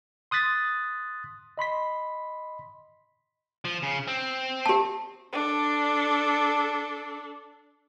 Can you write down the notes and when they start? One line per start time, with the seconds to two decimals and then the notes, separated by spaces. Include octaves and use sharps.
0.31 C6 D#6 F#6 A6 B6
1.58 D#5 B5 C6 B6
3.65 F3
3.82 C#3
4.07 C4
4.66 G4 A5
5.33 D4 A4